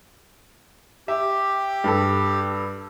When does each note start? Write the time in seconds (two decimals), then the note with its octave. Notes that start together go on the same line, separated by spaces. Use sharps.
1.08 G4 E5
1.84 G2 A4